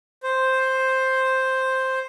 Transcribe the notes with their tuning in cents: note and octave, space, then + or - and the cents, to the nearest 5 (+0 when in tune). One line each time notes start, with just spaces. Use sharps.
C5 +5